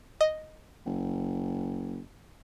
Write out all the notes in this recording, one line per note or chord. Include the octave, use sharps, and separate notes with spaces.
D#5
F#1